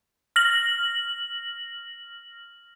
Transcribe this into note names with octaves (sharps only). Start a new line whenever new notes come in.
F6 A#6 F#7